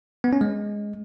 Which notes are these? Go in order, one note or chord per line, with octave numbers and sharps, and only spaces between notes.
B3
C#4
G#3